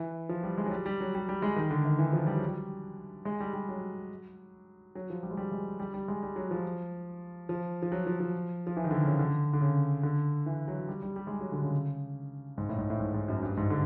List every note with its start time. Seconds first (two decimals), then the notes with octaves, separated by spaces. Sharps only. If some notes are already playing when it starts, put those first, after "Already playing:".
Already playing: E3
0.29 F3
0.43 G3
0.58 G#3
0.66 F#3
0.71 G3
0.86 G3
1.01 F#3
1.15 G3
1.29 G3
1.42 G#3
1.56 D#3
1.71 D3
1.85 D#3
1.99 E3
2.13 F3
2.27 G3
2.37 F#3
2.48 G3
3.25 G#3
3.40 G3
3.54 G3
3.69 F#3
4.95 F#3
5.10 F3
5.23 G3
5.31 G#3
5.37 G3
5.52 G#3
5.80 G3
5.94 G3
6.08 G#3
6.23 G3
6.36 F#3
6.51 F3
7.49 F3
7.82 F3
7.92 F#3
8.06 F3
8.20 F3
8.67 F3
8.77 E3
8.84 D#3
8.91 D3
9.05 C#3
9.19 D3
9.53 D3
9.61 C#3
10.03 D3
10.46 E3
10.68 F#3
10.88 G3
11.03 G3
11.16 G3
11.27 G#3
11.31 G3
11.41 F#3
11.52 D3
11.62 C#3
12.58 G#2
12.69 A2
12.78 G#2
12.90 A2
13.00 G#2
13.14 G#2
13.28 F#2
13.43 G2
13.57 G#2
13.70 D3